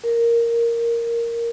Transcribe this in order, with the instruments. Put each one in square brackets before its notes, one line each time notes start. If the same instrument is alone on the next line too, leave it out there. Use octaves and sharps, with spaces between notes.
[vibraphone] A#4